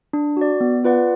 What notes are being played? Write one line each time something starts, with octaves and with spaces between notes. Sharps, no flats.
D4
F#4 D5
B3
F4 B4 D5 F#5